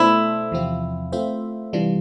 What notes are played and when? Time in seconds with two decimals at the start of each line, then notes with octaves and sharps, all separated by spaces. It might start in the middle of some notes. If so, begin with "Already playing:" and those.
Already playing: B2 A3 D4 E4 A4 C5
0.51 E2 C3 F3 C4 F4
1.12 A3 C4 F4 C5 E5
1.73 C3 E3 G3 D4 F4